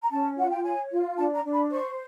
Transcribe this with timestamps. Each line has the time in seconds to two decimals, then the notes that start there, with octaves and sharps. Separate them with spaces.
0.03 A#5
0.11 C#4 A5
0.36 F4 F#5
0.50 G5
0.64 C#5 G#5
0.91 F4
1.18 D4 A5
1.35 A#5
1.44 D4
1.53 B5
1.70 C5 C#6